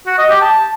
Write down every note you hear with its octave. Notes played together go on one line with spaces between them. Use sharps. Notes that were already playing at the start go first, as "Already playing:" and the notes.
F#4
D#5
G4
A5